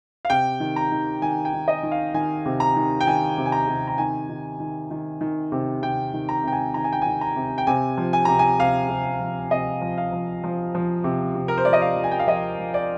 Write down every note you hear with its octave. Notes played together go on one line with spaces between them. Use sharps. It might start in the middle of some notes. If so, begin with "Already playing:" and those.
F5
C3 G5
D#3
A#5
D#3
D#3 G#5
G5
D#3
D#5
D#3
F5
D#3 G#5
C3
A#5
D#3
G5
D#3 G#5
C3
G#5
A#5
C3
A#5
D#3 G#5
D#3
D#3
D#3
D#3
C3
C3 G5
D#3
A#5
C3 G5
G#5
D#3 A#5
G#5
G5
G#5
D#3
A#5
C3
G5
C3 G#5
F3
G#5
C3 A#5
G#5
C3 F5
C3
F3
C3 D#5
F3
F5
F3
F3
F3
C3
C3
A#4
C5
F3 D5
D#5
F5
F3
G#5
G5
F5
F3 D#5
F3
D5